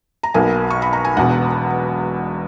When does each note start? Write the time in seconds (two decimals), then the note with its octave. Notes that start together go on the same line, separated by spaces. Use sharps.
0.23 A#5
0.34 B1 B2 A#3 G#5
0.71 C#6
0.82 B5
0.93 A#5
1.05 G#5
1.16 E1 E2 B2 F#5